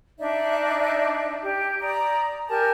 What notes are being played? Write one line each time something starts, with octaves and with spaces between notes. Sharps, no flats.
D4 D#4 D5 E5
G4
D5 A#5 D#6
G4 A#4 G#5 A5